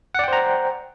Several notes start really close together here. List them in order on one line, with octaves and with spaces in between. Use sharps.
F#5 D5 G5 C5 A#5